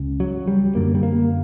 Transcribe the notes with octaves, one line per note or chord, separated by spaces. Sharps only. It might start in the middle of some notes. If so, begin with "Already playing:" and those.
Already playing: C#2 C#3
F#3
G3
F#2 D3 A#3
G3
A#3